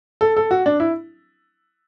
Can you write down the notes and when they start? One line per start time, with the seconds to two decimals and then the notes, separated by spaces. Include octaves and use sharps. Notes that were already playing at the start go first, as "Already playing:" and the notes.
0.21 A4
0.37 A4
0.51 F#4
0.66 D4
0.80 E4